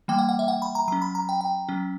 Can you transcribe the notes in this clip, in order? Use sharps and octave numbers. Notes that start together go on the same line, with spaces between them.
E3 G3 A#3 G5
F#5
F#5
E5
F#5
B5
A#5
F#3 C#4 A#5
B5
A#5
G5
G5
F#3 C#4